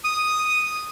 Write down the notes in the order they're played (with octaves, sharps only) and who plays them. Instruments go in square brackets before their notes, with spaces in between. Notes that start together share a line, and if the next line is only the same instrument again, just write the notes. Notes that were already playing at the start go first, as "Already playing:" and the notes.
[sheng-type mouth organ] D#6